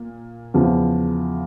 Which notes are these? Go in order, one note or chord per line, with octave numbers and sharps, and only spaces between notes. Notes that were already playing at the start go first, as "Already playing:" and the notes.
Already playing: A#2
E2 C#3 F3